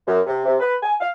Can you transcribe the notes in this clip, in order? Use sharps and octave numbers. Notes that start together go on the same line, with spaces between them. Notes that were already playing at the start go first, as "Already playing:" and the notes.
F#2
C3
C3
B4
G#5
F5